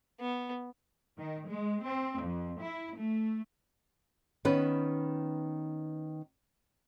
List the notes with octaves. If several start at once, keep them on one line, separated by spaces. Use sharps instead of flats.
B3
D#3
G#3
C4
F2
E4
A3
D#3 B3 C#4 B4